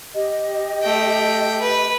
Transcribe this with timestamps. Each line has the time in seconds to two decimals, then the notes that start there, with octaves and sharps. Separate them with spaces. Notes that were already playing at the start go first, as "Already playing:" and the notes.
0.14 G4 D#5
0.82 A3 G5
1.60 B4